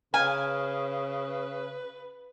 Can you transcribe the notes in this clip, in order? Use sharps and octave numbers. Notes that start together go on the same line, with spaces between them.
C#3 B4 F5 G#5